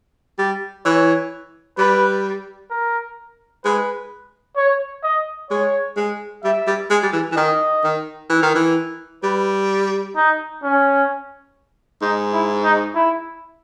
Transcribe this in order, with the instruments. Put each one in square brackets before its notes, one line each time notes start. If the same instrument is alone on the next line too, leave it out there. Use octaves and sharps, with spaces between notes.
[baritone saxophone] G3
[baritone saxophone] E3 [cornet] C#5
[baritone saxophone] G3 [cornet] B4
[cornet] A#4
[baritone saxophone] G#3 [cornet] B4
[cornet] C#5
D#5
[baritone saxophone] G#3 [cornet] C#5
[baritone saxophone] G#3
[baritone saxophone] G3 [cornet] E5
[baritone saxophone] G3
G#3
G3
E3
E3
[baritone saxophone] D#3 [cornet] D#5
[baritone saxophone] D#3
E3
D#3
E3
[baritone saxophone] G3 [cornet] B4
[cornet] D#4
C#4
[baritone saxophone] G#2 [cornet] D#4
[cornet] E4
D#4
E4